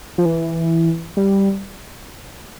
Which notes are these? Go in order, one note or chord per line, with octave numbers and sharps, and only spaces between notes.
F3
E3
G3